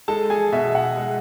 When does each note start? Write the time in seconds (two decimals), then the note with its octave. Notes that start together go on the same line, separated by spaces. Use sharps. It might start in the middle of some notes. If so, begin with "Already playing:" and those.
0.08 G#3 A4 A5
0.30 G#4 G#5
0.53 B2 E5
0.75 F#5
0.97 G#3